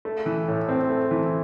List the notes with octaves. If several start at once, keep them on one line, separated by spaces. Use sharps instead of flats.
A3
E3
A2
C4
A3
E3